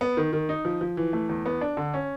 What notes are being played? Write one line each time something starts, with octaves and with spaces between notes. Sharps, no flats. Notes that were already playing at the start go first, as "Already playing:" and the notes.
B3
D#3
D#3
D#4
F3
F3
E3
A3
E2
B3
D4
D3
C#4